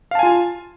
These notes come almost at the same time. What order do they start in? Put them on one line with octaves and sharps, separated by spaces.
F5 A5 G#5 F4